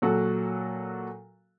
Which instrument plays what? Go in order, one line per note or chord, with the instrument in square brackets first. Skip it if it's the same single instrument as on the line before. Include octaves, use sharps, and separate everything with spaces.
[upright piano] A#2 F#3 F#4 A4